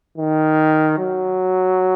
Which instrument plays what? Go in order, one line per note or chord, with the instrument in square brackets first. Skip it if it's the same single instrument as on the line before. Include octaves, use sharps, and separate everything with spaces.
[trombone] D#3
F#3